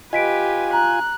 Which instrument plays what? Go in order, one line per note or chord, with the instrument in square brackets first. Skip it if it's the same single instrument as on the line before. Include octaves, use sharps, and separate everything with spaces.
[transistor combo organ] F4 G#5 [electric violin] G4 B4 [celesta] D#5 B6 D7
[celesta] A#5 [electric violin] F#6